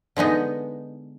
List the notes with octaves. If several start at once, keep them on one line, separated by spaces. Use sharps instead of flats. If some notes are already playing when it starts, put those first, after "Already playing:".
D3 G#3 B3 D#4